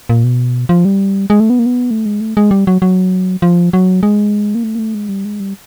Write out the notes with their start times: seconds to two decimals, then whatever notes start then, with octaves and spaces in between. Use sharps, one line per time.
0.09 A#2
0.24 B2
0.69 F3
0.85 G3
1.30 G#3
1.40 A3
1.50 B3
1.59 A#3
1.66 B3
1.91 A3
2.06 G#3
2.21 A3
2.37 G#3
2.51 G3
2.67 F#3
2.82 F#3
3.42 F3
3.73 F#3
4.03 G#3
4.55 A#3
4.64 A3
4.75 A#3
4.79 A3
4.95 G#3
5.09 G3
5.25 G#3
5.40 G3